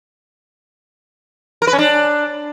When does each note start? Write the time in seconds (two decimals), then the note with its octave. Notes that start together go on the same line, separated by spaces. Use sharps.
1.62 A#4
1.67 B4
1.73 C#4
1.79 D4